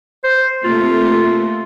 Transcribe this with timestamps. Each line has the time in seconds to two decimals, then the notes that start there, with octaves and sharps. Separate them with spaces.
0.24 C5
0.65 C3 A3 A#3 F4